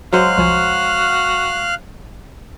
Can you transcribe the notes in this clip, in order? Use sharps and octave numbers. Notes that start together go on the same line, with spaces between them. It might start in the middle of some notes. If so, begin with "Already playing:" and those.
F#3 G#3 C5 F5 F6 F#6
C2 F3 F#4 G#5